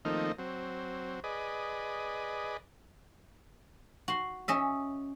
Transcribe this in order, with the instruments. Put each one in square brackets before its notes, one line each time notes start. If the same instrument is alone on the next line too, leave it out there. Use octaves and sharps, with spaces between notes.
[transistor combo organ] D#3 F3 A3 A#3 C4 D#4
F#3 C4
G#4 B4 D5 D#5
[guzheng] F#4 C6
C#4 D#5 E5